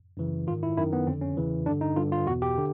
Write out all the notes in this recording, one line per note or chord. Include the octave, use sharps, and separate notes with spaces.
F#2 C#3 E3
G#2 D#3 F4
E4
F#2 D#3 E4
B3
F2 D3 C4
C#4
E2 C#3 E3
G2 D3 D4
D#4
G2 D3 F4
F4
E2 B2 F#4
G4
D3